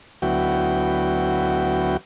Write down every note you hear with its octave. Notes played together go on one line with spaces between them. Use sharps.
D2 F#3 B3 E4 F#4 G5